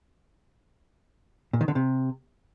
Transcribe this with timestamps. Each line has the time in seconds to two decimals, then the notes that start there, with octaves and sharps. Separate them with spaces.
1.53 A#2
1.61 D#3
1.68 D3
1.75 C3